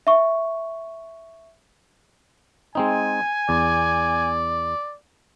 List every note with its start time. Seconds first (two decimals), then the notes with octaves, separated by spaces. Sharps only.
0.07 E5 C#6
2.75 G#3 C4 D#4 G#5
3.49 E2 D5